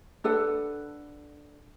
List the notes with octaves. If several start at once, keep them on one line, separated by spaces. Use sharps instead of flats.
D4 A4 B4 F#5